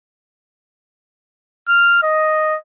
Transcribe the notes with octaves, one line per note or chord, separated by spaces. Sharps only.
F6
D#5